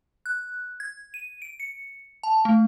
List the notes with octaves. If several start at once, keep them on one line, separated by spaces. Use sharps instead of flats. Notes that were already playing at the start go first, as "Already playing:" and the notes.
F#6
G#6
D#7
D7
C#7
A5
A3